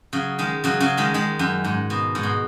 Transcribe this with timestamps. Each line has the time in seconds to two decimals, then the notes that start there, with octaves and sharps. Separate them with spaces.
0.13 C#3 F#3
0.39 D#3 G#3
0.64 C#3 F#3
0.80 C#3 F#3
0.97 D#3 G#3
1.14 D#3 G#3
1.39 F#2
1.64 G#2
1.90 B2
2.15 G#2
2.23 B2